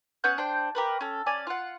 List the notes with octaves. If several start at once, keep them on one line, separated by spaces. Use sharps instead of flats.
B3 C#4 F#5 G6
D4 C5 G5
G4 A#4 B4
C#4 A4
C#4 D5 G#5
F4 F#5